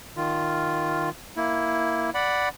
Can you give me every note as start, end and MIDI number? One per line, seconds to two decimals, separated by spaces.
0.17 1.10 51
0.17 1.10 65
1.37 2.10 58
1.37 2.10 64
2.15 2.49 74
2.15 2.49 78
2.15 2.49 83